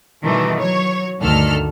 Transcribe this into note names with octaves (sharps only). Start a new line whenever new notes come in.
B2 D#3 E3 G3 A3
F#3 C#5
D2 G2 D#3 A4 F6